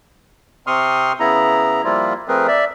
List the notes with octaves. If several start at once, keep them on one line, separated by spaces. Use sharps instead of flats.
C3 C4 C6 C#6 D#6 F6
C#3 B3 E4 A#5
F3 G3 A#3 E4 F4
F3 A3 C4 G#4 A#4 B4
D5 E5